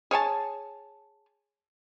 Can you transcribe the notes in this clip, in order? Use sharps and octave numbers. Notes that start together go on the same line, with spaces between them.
G#4 C#5 G#5 A5